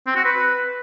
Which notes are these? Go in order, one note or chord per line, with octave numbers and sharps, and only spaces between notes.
C4
F#4
B4